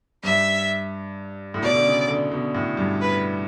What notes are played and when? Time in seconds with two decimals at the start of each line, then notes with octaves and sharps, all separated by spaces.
0.24 G2 E5
1.54 A2
1.62 B2 D5
1.74 D3
1.85 C#3
2.08 D3
2.32 B2
2.55 A2
2.77 G2
3.01 B4